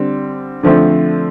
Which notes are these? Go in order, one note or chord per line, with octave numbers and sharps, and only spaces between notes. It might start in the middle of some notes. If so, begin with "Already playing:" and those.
Already playing: D3 G3 C4
D3 F3 A3 C4